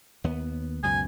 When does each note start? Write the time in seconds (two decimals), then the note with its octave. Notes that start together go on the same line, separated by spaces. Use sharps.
0.24 D#2 B3
0.83 C#2 F#2 B2 G#5